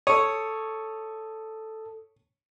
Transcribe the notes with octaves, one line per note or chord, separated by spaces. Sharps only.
A4 C#5 D#6